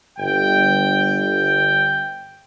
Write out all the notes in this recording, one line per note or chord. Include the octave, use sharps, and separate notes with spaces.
G1 G5